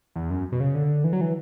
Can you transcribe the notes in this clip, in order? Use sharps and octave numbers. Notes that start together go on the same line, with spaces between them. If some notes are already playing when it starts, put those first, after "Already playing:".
E2
F#2
B2
C#3
D3
E3
F#3
E3